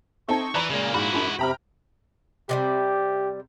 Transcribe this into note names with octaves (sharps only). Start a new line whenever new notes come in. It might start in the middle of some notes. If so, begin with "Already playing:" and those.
C4 D#4 A4 E5 A5 C#6 G#6
E3 D5 A#5 B5
A#2 C#3 G#3 A#3
G#2 E4 F#4 D5 F5 B5
F#2 F3 G#3 D4 B5
F#2 C3 E5 G5 A#5 B5 F6
C3 D#3 G3 G4